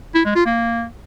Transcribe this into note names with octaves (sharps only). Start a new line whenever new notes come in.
E4
G#3
F4
A#3